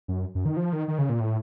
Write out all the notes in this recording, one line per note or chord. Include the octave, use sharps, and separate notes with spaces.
F#2
F#2
D#3
F3
D#3
D#3
C#3
A#2
A2